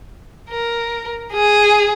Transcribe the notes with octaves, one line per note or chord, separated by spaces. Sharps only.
A#4
G#4